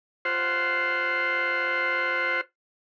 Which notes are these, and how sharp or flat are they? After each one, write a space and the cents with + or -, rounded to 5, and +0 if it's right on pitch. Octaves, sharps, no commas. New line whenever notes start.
F4 +0 C5 +0 F#5 +10